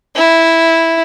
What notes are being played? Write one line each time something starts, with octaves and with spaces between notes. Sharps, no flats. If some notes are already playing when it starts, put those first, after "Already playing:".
E4